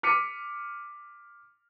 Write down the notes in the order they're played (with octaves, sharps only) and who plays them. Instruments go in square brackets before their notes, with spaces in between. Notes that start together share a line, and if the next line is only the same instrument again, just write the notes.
[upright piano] D6 F6 B6 C#7 D#7